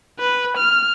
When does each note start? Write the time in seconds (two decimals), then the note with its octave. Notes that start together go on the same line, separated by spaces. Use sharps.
0.19 B4
0.57 F6